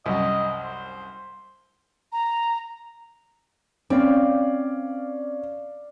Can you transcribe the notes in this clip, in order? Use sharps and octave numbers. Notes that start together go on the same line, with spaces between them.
C2 F#2 D#5
C5
A#5
C4 C#4 D5 F5